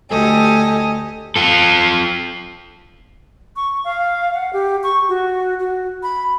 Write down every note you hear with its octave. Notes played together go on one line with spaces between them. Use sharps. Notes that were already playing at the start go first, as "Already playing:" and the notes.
D2 G4 A4 D#5 G#5
F4 A4
C#6
F5
F#5
G4
C#6
F#4
F#4
B5